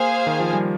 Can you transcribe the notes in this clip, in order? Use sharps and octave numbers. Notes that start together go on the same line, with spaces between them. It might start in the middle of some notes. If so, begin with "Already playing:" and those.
Already playing: A#3 G#4 C5 F5 G#5
D#3
F3
G3